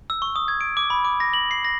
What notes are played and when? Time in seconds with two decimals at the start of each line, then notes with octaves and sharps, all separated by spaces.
0.10 E6
0.22 C#6
0.36 D#6
0.48 G#6
0.61 D7
0.77 D6
0.90 B5
1.05 D6
1.20 A#6
1.33 F#7
1.51 C7
1.65 A#6